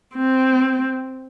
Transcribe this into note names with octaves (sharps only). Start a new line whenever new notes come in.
C4